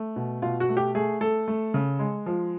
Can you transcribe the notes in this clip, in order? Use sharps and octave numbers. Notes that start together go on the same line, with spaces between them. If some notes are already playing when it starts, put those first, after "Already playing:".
Already playing: A3
B2
B2 F4
F#4
A3
G4
A3 G#4
A3 A4
A3
C#3
G#3
F3